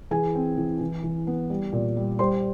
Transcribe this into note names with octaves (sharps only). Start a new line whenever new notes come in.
E3 G#4 G#5
C4
E3
E3
E3
B3
G3
A#2
G3
G3 C5 C6